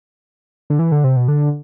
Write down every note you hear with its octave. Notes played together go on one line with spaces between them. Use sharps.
D3
E3
D3
C3
B2
D3